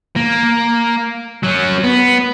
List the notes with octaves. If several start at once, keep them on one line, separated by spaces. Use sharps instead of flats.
A#3
F#3 C#4
B3